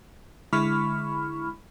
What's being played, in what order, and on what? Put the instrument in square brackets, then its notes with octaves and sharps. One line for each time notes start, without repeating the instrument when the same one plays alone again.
[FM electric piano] D3 G#3 E4 B5 C#6 F6